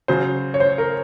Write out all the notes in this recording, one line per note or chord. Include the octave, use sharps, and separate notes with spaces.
C#3 F#3 C5
C#5
C5
A#4